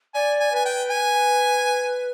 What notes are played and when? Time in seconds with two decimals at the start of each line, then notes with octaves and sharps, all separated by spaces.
0.14 D5 G#5
0.40 G#5
0.52 B4 G#5
0.65 G5
0.90 G#5